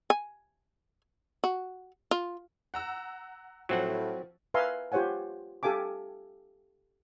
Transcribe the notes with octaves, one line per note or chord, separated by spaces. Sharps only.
G#5
F#4
F4
F#5 A#5 E6
A2 F3 F#3 C4 F#5
B4 E5 F5 G#5 A#5 C6
F4 G4 C5 C#5 F#5 G#5
G4 A4 F5 G#5 D6